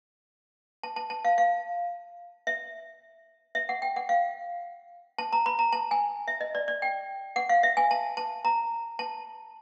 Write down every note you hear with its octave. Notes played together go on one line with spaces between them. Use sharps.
A5
A5
A5
F5
F5
E5
E5
F#5
G5
F#5
F5
A5
A#5
B5
A#5
A5
G#5
E5
D#5
D5
D5
G5
F#5
F5
E5
G#5
A5
A5
A#5
A5